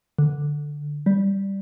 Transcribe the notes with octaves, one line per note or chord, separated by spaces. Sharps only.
D3
G3